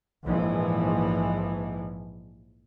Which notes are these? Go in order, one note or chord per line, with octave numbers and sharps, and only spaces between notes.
A#1 G#2 E3 F3